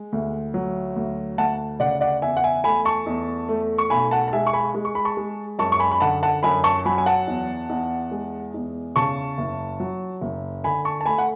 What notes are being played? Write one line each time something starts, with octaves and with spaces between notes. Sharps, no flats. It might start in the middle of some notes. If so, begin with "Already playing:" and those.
Already playing: G#3
D2
F#3
D2
D2 F#5 A5
C#3 D5 F#5
D5 F#5
E2 E5 G#5
F#5
E5 G#5
A3 G#5 B5
A5 C#6
E2
A3
C#6
B1 G#5 B5
F#5 A5
A5
G#3 E5 G#5
C#6
G#5 B5
G#3
C#6
B5
A5 C#6
G#3
F#2 A5 C#6
C#6
G#5 B5
B5
D3 F#5 A5
F#5 A5
F#2 G#5 B5
A5 C#6
F#3 G#5 B5
G#5
F#5 A5
E2
E2
G#3
E2
C#3 A5 C#6
F#1
F#3
F#1
D3 G#5 B5
A5 C#6
A5
A3 G#5 B5
F#5